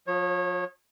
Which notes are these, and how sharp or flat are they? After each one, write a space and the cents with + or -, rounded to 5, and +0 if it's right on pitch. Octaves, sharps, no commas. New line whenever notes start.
F3 +30 C#5 -25